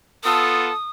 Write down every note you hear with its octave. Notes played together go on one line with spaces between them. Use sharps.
B3 F4 A4 D#6